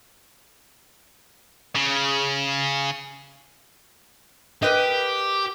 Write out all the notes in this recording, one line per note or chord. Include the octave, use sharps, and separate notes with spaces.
C#3
G4 A#4 B4 D#5